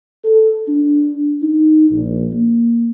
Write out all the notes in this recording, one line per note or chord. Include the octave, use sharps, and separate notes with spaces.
A4
D4
D#4
A#1
A#3